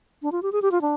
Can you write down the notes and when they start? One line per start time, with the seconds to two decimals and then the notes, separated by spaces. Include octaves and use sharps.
0.22 D4
0.32 F4
0.43 G4
0.52 G#4
0.62 G4
0.72 F4
0.81 D4